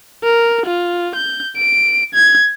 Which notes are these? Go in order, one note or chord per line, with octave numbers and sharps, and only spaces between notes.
A#4
F4
G6
D7
G#6